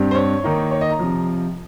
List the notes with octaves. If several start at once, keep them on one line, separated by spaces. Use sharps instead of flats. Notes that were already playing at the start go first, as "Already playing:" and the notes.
Already playing: G2 G3 C4
C5
C#5
D#3 A#3 D#4
C#5
D#5
A#5
C3 F3